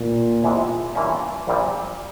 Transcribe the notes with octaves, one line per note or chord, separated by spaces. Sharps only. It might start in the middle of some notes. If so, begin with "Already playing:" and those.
Already playing: A#2
E2 C3 E3 G#3
G2 E3 A#3 C#4 F4
A#1 A#2 G3